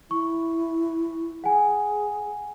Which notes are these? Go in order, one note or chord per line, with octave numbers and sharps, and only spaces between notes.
E4 C#6
G#4 F#5 G#5